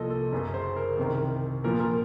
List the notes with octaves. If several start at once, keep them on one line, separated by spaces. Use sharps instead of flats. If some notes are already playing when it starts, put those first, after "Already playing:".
Already playing: C2 A#2 F3 A4 D#5
A4
F#1 F#2 C#3
C5
A#4
C2 C3 D#3
A#1 A#2 F3 A#4
A#4